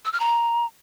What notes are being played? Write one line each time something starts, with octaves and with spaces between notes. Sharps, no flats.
E6
F6
A#5